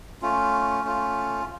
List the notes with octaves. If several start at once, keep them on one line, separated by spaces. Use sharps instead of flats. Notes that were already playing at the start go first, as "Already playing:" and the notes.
A3 C#4 F4
A3 C#4 F4